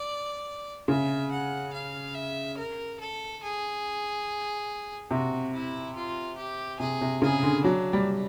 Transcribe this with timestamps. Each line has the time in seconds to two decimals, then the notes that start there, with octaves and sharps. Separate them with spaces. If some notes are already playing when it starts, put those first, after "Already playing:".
Already playing: D5
0.88 C#3 E5
1.31 F#5
1.73 F5
2.15 E5
2.58 A#4
3.00 A4
3.42 G#4
5.11 C3 F#4
5.54 E4
5.96 F4
6.38 G4
6.80 C3 G#4
7.01 C3
7.22 C#3 G#4
7.43 D3
7.64 F#3 D4
7.93 G3